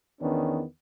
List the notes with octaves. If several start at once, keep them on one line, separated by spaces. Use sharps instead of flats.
E2 D#3 B3 C#4 D4